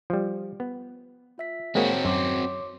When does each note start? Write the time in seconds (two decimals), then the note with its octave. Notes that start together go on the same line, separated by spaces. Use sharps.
0.10 F3 G3
0.60 B3
1.38 F4 E5 B6
1.75 G#3 A#3 C4 F#4 G#4 C#5
2.05 F#2 C#5 C6 D6